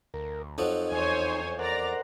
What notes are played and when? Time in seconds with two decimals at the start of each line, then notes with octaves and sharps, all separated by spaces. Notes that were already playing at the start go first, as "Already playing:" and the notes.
0.14 D2 A#4
0.58 F2 F3 F#3 D#4
0.92 E2 C5 C#5 G#5
1.59 A#4 C5 D5 F#5 A#5